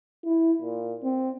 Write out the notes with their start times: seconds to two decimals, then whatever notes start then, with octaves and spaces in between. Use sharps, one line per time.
0.25 E4
0.62 A#2
1.03 C4